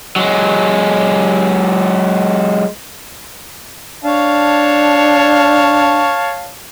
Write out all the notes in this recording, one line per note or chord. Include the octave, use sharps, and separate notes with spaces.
F#3 G#3
D4 C#5 F5 A5